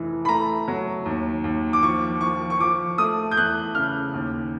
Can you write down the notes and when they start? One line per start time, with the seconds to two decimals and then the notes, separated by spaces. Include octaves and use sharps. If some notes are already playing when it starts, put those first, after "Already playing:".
Already playing: F1 E3
0.25 B5
0.29 A3 A#5
0.68 F#3
1.06 D#2
1.44 D#2
1.73 D6
1.83 F3 C#6
2.21 F3 C#6
2.50 C#6
2.60 F3 D6
2.98 A3 D#6
3.31 G6
3.37 E2 F#6
3.75 C#3 F6
4.14 D#2